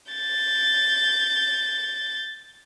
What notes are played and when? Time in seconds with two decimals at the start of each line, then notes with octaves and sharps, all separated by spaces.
0.12 G6 A6